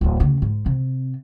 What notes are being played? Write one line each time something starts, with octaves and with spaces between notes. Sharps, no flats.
D1 E2
D2 C#3
G#2
C3